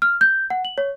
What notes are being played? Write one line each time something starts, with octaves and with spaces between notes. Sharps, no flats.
F6
G6
F#5
F#7
C#5